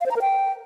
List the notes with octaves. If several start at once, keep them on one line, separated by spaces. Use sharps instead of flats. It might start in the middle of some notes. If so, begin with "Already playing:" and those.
F5
C5
A#5
A#4
G5